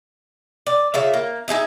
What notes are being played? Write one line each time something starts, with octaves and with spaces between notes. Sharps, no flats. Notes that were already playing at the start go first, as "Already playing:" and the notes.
D5
C#3 F4 E5
A#3
D#4 G#4 D#5 E5